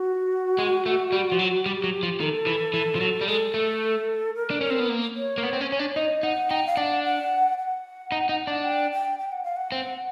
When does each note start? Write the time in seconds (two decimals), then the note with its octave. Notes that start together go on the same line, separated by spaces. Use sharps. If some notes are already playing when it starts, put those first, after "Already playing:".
Already playing: F#4
0.59 G#3
0.86 A3
1.12 G3
1.32 F3
1.39 F#3
1.66 G3 G4
1.84 F#3
2.03 F3
2.20 D#3 A4
2.47 E3
2.74 E3
2.95 F3
3.01 F#3
3.21 G3
3.28 G#3 A4
3.54 A3
4.35 A#4
4.50 D4
4.61 C#4 A#4
4.70 C4
4.80 B3
4.89 A#3
5.16 C#5
5.38 A#3
5.43 B3
5.53 C4
5.61 C#4
5.72 C#4
5.79 D4
5.96 D#4 D#5
6.23 D#4 F#5
6.50 D#4 G5
6.67 F5
6.77 D4 F#5
7.04 F#5
7.58 F#5
8.12 D#4
8.29 D#4
8.47 D4
8.65 G5
8.92 G5
9.19 G5
9.32 F#5
9.44 F5
9.57 F#5
9.72 C4